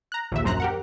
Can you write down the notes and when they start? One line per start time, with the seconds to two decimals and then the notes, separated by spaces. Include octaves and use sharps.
0.12 A#5 F#6
0.32 A#1 D#2 E5
0.44 A#1 F#2 C5 A#5 F#6
0.60 G4 A#4 F#5